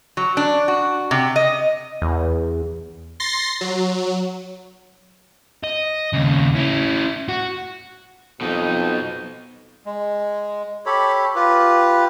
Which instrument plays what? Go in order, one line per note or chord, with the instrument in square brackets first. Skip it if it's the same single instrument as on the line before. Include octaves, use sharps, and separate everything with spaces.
[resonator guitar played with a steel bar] F#3
D4
F#4
C3
D#5
[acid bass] E2
[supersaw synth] C6 A6 A#6 C7
F#3
[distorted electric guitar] D#5
D#2 C#3
C#4 E4
F#4
[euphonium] F2 [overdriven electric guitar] B2 D#4
[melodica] G#3
G4 A4 C#5 B5
F4 G4 B4